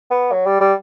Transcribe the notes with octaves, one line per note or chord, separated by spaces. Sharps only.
B3
F#3
G3
G3